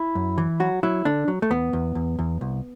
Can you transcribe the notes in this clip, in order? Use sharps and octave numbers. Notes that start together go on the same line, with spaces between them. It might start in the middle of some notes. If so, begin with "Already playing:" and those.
Already playing: E4
F#2
E3
F#3 F#4
F#3 E4
D3 D4
F#3
A3
E2 B3
E2
E2
E2
C2